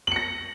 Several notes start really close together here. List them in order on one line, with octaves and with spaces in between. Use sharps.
F#7 C#7 A#6